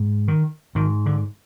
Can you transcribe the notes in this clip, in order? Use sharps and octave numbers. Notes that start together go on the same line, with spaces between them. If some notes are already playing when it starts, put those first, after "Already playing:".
Already playing: G#2
D#3
G#2 D#3
D3